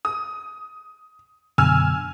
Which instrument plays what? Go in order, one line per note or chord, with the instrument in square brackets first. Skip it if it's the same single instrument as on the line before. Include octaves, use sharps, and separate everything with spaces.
[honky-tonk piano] D#6
[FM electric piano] F#2 B2 D3 [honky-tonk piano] G#5 E6 F6